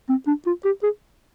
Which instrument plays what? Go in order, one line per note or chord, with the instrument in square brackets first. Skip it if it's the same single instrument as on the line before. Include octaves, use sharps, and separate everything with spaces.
[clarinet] C4
D4
F4
G4
G#4